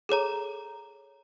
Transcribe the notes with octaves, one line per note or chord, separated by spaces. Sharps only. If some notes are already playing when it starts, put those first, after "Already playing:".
G#4 A4 C#5 A#5